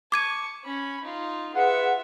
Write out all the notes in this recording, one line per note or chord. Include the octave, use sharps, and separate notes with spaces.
A5 C#6 D6 G#6 D#7
C#4 B5
D#4 F4
F4 G#4 B4 E5 F#5